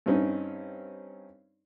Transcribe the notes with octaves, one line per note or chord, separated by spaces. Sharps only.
G2 C4 C#4 D#4